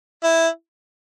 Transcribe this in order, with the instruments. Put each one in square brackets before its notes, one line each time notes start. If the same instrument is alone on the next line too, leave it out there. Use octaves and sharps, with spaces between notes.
[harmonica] E4